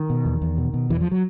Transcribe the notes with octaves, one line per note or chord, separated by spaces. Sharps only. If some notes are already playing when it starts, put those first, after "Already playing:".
Already playing: D#3
B2
E2
E2
B2
B2
E2 E3
F3
F#3